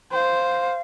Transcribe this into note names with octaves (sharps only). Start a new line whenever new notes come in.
C5 F5 G5